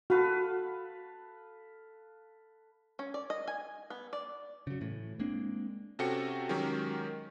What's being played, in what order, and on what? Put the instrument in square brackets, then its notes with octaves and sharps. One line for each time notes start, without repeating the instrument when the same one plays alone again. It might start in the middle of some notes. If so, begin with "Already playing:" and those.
[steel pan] F#4 [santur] A4 B4 F5
[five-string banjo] C#4
D5
D#5
G#5
B3
D5
[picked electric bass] C#3 F#3
A2 E3
G#3 A#3 C4 D4
[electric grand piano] C3 C#4 F#4 A4 G5 C#7
D#3 F#3 G#3 C#4 G4 A#4